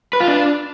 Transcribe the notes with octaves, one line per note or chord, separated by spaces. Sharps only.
B4
F4
D4